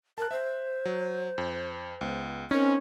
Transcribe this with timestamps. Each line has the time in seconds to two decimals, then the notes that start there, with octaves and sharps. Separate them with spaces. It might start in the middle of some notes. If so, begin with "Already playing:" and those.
0.18 A#4 A5 F#6
0.31 C5 E5
0.85 F#3
1.38 F2
2.01 C#2 B3
2.51 C4 C#4 D#4 A#4